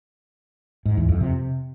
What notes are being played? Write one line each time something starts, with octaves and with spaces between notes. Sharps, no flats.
G#2
E2
F2
C3